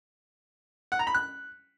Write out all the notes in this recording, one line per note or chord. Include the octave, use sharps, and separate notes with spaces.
F#5
A#5
B5
F#6